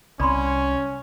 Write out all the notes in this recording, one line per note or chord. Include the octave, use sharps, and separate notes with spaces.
C2 C#4 D5 B5 C6